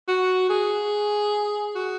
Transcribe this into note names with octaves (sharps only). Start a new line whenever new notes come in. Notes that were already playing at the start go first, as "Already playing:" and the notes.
F#4
G#4
F#4